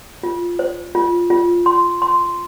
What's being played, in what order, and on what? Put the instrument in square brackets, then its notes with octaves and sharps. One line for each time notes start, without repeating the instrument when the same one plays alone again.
[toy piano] F4
C5
F4
F4
C6
C6